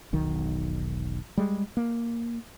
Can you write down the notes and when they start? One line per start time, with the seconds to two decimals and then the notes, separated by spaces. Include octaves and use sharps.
0.13 E1 B1 D#3
1.37 G3 G#3
1.77 A#3